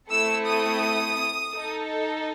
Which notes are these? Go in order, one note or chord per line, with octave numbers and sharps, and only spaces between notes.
A3 C4 E4 A4 E6
D#6
D#4 A4